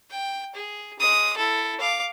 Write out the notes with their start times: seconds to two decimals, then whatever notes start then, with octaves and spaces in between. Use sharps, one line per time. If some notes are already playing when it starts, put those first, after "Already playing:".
0.11 G5
0.55 G#4
0.99 G#3 D#6
1.37 E4 A4
1.80 F5 D6